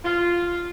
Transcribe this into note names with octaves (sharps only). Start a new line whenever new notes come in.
F4